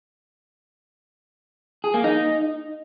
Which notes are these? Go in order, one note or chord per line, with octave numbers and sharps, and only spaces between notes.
G#4
A#3
D#4